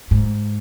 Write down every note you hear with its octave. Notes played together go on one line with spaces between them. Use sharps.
G#2